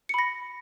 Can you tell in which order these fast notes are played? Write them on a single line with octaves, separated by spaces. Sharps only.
C#7 B5 A#6